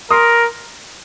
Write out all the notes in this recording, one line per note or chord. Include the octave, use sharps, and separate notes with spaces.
A#4 C6 D#6